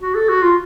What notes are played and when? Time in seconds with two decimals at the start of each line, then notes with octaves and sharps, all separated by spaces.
0.02 F#4
0.15 A4
0.29 F#4
0.43 F4